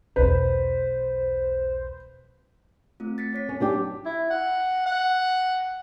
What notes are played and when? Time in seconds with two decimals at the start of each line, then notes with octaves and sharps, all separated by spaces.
0.16 B1 E2 B4 C5
3.00 A3 C4 F4
3.18 A6 B6 C#7
3.33 C4 C#5 B6
3.49 C#4
3.60 F#3 D4 G4
4.05 E4
4.30 F#5
4.86 F#5